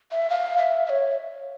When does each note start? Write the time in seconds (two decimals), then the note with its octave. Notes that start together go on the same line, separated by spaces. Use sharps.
0.12 E5
0.30 F5
0.58 E5
0.86 E5
0.90 C#5